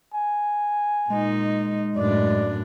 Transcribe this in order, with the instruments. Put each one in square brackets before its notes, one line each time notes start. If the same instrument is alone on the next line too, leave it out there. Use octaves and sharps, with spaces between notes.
[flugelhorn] G#5
[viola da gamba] A#2 D#4 [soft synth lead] G#3
[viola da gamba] F#2 A2 D4 [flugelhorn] D5